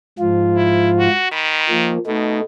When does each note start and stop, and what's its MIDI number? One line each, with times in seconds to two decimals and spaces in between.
0.19 1.08 44
0.19 1.08 53
0.19 1.08 65
0.56 0.89 64
0.99 1.28 66
1.32 1.94 51
1.32 1.59 83
1.69 1.98 53
1.69 1.98 58
2.07 2.40 47
2.07 2.41 57
2.07 2.41 63